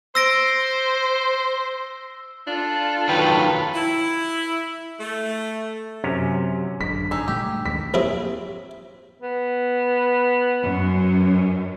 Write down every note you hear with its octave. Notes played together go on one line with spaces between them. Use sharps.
C5 E6 A#6 D7
D4 F4 A4
D#3 F#3 B4 F5 G5
E4
A3
F#2 C3 C#4
G#1 F#2 D3 B6
D#4 G#4 E6
D2 A#2 G3 A3 G4
F#1 D#2 D#3 G#3 B6
A#1 A2 C3 C4 E4 G#4
B3
F#2